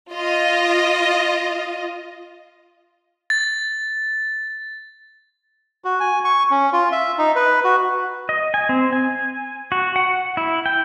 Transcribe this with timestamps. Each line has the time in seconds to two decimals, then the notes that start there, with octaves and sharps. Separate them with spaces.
0.12 F4 D#5
3.30 A6
5.85 F#4
6.00 G#5
6.25 C#6
6.51 C#4
6.73 F4
6.92 E5
7.18 D#4
7.36 B4
7.64 F#4
8.29 D#5
8.54 G#5
8.69 C4
8.93 G#5
9.72 F#4
9.96 F#5
10.37 E4
10.66 G5